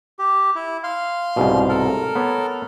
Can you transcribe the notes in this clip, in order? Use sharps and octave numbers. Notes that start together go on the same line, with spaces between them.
G4
E4
F5 C6
C2 G#2 B2
A4 A#4
B3 C#5